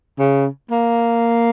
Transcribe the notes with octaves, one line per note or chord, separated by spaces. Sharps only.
C#3
A#3